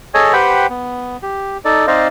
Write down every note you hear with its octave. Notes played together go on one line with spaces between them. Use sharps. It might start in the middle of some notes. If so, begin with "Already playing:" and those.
G#4 A4 C#5 D#5 G#5
G4 B4 C5 F#5 G5 B5
B3
G4
D#4 A4 D5
C4 D#4 C5 D5 D#5 F5